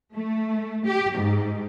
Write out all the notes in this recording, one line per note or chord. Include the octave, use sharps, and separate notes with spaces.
A3
G4
G#2